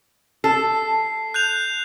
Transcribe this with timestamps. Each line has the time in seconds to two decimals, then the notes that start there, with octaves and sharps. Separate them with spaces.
0.44 A4 C7
1.34 F#6 G6 F7